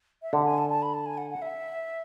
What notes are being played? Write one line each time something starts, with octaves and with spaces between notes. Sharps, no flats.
E5
D3 F#5
G#5
A5
A5
B5
A5
G#5
F#5
F#5
E5